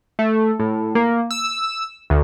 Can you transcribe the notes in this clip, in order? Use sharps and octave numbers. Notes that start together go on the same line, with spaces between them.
A3
A2
A#3
E6
D2